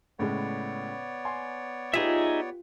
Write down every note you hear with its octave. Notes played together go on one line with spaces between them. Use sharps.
A2 C#3 G#3 B3 C#5 D5
G#5 C6
D#4 F4 G4 G#4 B4 E5